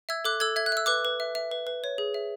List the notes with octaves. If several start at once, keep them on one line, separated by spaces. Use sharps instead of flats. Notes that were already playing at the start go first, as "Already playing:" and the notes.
E5 E6 G#6
A4 D6 F#6
A4 E6 G#6
E5 G#6
F#6
E5 E6
B4 D6 F#6
B4
E5
E5
B4
B4
C#5
G#4
E5